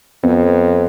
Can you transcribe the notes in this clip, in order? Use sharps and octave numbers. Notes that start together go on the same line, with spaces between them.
F2 B3